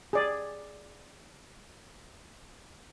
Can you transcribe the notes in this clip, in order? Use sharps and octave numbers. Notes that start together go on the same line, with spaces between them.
G#4 D5